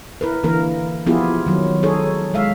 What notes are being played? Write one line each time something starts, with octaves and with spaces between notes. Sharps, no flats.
E4 A#4 B4
D3 E3 A#3 A#4
F3 B3 E4 F4 G4 G#4
D#3 F#3
D#4 G#4 A4 C#5
G#3 E5 F5